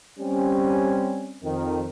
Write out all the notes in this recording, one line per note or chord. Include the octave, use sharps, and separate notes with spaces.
G3 C4 C#4
F2 D#3